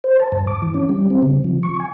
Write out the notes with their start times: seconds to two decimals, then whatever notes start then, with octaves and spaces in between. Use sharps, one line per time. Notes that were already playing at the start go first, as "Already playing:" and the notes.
0.04 C5
0.20 A5
0.32 G2
0.47 D6
0.62 E3
0.74 C#4
0.89 G3
1.10 C4
1.22 C#3
1.44 F3
1.63 C#6
1.80 G#5